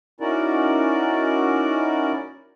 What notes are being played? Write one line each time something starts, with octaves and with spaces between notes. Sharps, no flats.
C#4 D#4 E4 F#4 A#4 D5